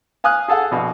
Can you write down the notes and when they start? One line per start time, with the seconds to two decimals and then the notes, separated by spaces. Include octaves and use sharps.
0.24 F5 G#5 D#6 F6 F#6
0.48 G#4 A4 F5 F#5
0.71 A#1 B2